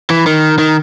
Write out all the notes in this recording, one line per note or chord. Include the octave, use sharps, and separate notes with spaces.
E3
D#3
D#3